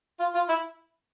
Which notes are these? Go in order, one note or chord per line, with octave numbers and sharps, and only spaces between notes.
F4
F4
E4